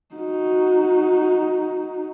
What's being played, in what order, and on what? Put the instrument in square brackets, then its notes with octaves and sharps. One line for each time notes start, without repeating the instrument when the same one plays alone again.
[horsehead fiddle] D#4 F#4